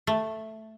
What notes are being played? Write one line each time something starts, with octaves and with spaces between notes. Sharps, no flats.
A3